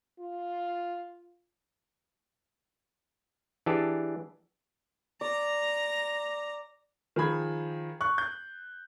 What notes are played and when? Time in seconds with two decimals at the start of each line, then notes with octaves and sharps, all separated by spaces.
0.20 F4
3.66 E3 D4 G4 G#4 A5
5.21 D5 A#5
7.16 D#3 F3 G#4 B5 G#6
8.01 C#6 F#6
8.18 G6